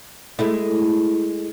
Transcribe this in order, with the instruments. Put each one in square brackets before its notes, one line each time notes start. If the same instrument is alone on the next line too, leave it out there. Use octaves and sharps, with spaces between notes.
[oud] G#3 A3 E4